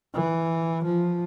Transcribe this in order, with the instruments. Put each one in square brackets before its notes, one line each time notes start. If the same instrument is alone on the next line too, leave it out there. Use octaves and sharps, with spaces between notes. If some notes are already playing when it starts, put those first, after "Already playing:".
[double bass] E3
F3